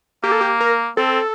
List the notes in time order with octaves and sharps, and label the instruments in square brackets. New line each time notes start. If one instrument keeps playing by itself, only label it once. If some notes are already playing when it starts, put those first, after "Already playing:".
[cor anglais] A#3 [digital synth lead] G4
[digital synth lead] A4
G4
A#4
[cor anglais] C4 [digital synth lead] A4